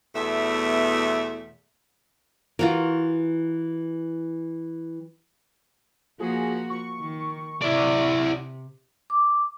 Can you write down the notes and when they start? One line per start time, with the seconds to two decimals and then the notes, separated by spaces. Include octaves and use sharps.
0.15 E2 B2 A3 E5
2.59 E3 F4 F#4 A#4
6.20 F3 A#3 F#4 G#4
6.70 C#6
7.00 D#3
7.62 C3 E4 D5
9.10 D6